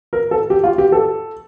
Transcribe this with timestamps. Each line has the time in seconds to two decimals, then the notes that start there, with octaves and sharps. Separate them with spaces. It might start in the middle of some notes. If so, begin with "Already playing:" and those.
0.13 A#4
0.31 A4
0.50 G4
0.64 F4
0.78 G4
0.92 A4